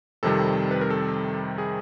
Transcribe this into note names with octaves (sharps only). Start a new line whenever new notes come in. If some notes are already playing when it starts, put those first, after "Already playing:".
F2 C3 D#3 G3 A4
B4
A#4
A4
G#4